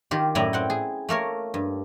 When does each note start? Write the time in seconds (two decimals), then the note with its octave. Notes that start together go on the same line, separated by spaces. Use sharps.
0.11 D#3 F4 G4
0.35 F#2 A2 E4 D5 D#5 A#5
0.53 C4 F#5 G5
0.70 G#4
1.09 A3 A#3 A#4 C#5
1.54 G2